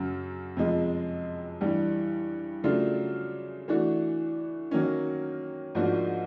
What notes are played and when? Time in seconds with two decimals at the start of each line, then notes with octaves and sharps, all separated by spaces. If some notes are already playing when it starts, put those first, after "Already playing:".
Already playing: F#2 C#3 F#3
0.57 F2 C3 F3 G#3
1.61 G2 E3 G3
2.64 C#3 F#3 A3 D4 F4
3.68 E3 A3 D4 F#4
4.71 D#3 F#3 A#3 C#4
5.75 G#2 F3 A#3 D4 F#4